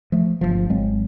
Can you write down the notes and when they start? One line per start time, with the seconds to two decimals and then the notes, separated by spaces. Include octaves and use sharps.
0.12 F3 A3
0.41 G1 C2 F3
0.70 G#1 F#3 G#3 C4